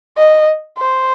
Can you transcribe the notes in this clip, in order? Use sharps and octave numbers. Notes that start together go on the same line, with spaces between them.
D#5
C5